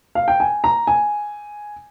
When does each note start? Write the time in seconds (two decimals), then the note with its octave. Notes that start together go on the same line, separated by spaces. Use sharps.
0.15 F5
0.28 G5
0.40 G#5
0.64 A#5
0.87 G#5